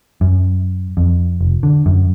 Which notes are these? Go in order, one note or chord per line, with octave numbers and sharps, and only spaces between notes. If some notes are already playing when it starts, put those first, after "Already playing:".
F#2
F2
F1
D3
F#2